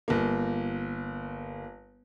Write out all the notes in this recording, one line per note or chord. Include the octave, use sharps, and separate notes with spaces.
G1 A#3